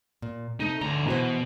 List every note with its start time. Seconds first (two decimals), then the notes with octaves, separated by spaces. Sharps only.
0.22 A#2
0.60 C3 A3 D#4
0.81 D2 D3 A#5
1.07 B2 E3 F#4 C5